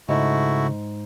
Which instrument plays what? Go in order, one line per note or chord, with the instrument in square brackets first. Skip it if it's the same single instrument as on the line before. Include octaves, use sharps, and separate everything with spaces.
[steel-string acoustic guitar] G#2 [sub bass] C#3 [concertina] A3 E4 F#4